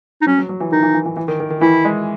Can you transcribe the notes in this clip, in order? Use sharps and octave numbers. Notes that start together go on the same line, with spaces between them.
D#4
F#3 C#4
F#3
F#3
E3
D#3 D#4
E3
E3
E3
E3
D#3
D#3
D#3
E3 E4
G#3